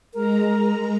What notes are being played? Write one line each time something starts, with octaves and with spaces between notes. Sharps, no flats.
G#3 A#4 A#5